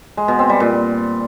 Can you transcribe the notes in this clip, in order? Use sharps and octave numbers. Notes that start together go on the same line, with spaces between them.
G#3
B2
C4
G3
A#2